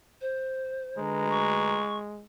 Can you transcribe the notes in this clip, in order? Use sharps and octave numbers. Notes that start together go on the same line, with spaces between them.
C5
D2 G#3 B4 A#5
C#6